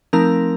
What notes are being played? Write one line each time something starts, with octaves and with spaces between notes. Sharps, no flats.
F3 A3 C4 D#4 A#4 A#5